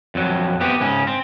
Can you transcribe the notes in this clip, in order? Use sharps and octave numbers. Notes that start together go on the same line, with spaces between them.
F2 F#3
B3 C4 G4
G#2 C#3 C#4
C4